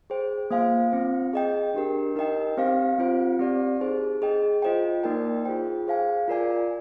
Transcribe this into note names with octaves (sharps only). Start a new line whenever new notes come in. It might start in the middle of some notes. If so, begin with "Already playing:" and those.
G#4 C5 G5
A#3 F4 C5 F5 G#5
C4 F4 C5
G#4 D#5 G5
D4 G4 A#4
D#4 A#4 D#5 G5
C4 G4 C5 F5 G#5
C4 F4 C5
C4 G4 D5
D#4 G#4 C5
G#4 D#5 G5
F4 C5 D#5 G5
A#3 D#4 A#4 D5 G5
F4 G#4 C5 G5
G#4 C5 F5 G#5
F4 A#4 D5 G#5